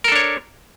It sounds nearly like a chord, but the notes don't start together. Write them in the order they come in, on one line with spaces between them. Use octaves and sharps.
A#4 A4 D4 C#5